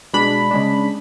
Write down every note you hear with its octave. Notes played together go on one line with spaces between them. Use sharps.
B2 G#3 D4 B5
C#3 G#3 D4